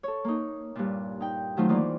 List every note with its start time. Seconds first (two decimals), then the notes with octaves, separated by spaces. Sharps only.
0.03 A4 C#5
0.24 A#3 D#4
0.75 G2 A#2
1.20 D#4 G5
1.57 D#3 F#3 A3 C4 D#4 F4
1.68 E3 A#3 D#4 F4 D5